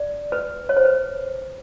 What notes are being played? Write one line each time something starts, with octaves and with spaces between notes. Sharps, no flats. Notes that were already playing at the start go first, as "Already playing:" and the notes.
Already playing: D5
B4
C#5
C5
B4